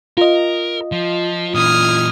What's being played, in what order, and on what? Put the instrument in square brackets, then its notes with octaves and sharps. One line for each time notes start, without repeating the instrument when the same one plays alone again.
[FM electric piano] F4 D#5 [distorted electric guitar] A#4
[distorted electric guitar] F3
[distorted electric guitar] A#2 E3 [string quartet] D#6 F6 G#6